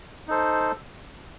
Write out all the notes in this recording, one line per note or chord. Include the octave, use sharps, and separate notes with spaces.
D#4 A4 C5